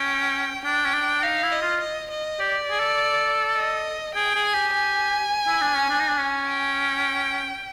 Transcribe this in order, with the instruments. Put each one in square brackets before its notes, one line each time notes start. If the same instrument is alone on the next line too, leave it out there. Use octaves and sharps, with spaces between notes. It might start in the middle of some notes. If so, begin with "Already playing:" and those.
Already playing: [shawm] C#4 [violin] G5
[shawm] D4 [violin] G5
[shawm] C#4
D4
[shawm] D#4 [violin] F5
[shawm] E4
[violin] D#5
[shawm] F4
[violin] D#5
D#5
[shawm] G4 [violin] D5
[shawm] G#4
A4
[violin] D#5
[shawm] G#4 [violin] G5
[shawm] G#4
[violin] G#5
[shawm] G4
[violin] G#5
[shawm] E4
D4
C#4
D4
D#4
D4
C#4
[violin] G5